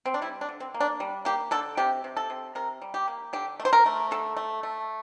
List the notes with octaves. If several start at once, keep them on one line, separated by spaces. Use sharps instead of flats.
C4
D4
G3 E4
D4
D3
C4
A#3
D4
G3
A#3 G4
D3 A4
C3 G4
C3
A4
C3
C3 A#4
G3
G4
A#3
D3 G4
A3
C5
A#4
A3
D3 A4
A3
A3